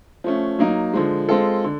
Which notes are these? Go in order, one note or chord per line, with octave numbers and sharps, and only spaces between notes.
F3 A3 C#4
F#3 A#3 D#4
D3 F3 G#3
G#3 C4 F4 A4
D3